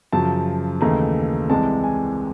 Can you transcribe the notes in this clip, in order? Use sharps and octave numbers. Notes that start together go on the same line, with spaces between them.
F#2 C#3 F3 A5
D#2 C#3 E3 A3 A#5
C2 C3 E3 G#3 A5
G#5